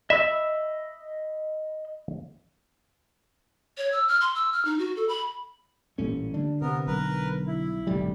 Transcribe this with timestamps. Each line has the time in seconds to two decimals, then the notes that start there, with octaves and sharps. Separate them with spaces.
0.10 D#5 E5 B5 E6
3.78 C#5
3.92 E6
4.08 F6
4.21 C6
4.35 E6
4.53 F6
4.65 D#4
4.78 F#4
4.96 A4
5.09 B5
5.98 A1 A#2 G3 A3 C#4
6.34 D3 G3 D4
6.61 C3 B3 A#4
6.87 B1 A#4 B4
7.47 E4
7.87 F#1 B1 G#2 D3 G3